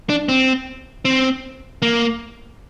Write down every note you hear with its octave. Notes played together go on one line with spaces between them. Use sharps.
D4
C4
C4
A#3